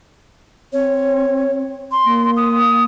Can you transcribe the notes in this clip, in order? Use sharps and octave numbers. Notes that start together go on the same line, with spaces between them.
C4 C#5
C6
A#3
D#6